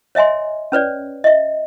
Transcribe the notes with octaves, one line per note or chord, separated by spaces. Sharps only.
C#5 D#5 E5 G#5 C6
C#4 B4 C#5 D5
D#5 E5